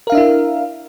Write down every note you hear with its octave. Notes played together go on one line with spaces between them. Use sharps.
D4 E4 A#4 E5 F5